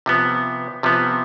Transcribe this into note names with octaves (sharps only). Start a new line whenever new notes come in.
C3 F3 B3
C3 F3 B3